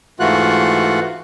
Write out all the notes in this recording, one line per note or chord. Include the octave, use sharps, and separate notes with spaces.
G#2 E3 A3 F4 F#4 F#6